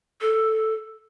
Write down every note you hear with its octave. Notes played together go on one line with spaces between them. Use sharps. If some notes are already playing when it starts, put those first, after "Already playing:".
A4